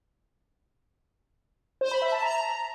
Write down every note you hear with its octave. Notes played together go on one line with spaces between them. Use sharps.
C5
B5
E5
A5
A#5